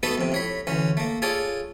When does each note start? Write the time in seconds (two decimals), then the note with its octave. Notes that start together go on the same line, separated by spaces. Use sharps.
0.03 A3 B3 D#4 F#4 A4 B4
0.18 F2 C3
0.32 A2 C#5 B5
0.67 D2 E3 C#4
0.97 A3 A#3
1.22 F4 G#4 A4 C#5 D5